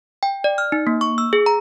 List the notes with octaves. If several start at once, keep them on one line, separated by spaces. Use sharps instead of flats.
G5
D5
F6
D#4
A#3
C#6
E6
G#4
A#5